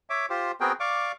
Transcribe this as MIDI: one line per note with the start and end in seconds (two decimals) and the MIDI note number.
0.10 0.26 73
0.10 0.26 76
0.10 0.26 86
0.30 0.52 65
0.30 0.52 67
0.30 0.52 72
0.61 0.73 59
0.61 0.73 60
0.61 0.73 66
0.61 0.73 68
0.61 0.73 70
0.61 0.73 79
0.80 1.12 74
0.80 1.12 77
0.80 1.12 85
0.80 1.12 86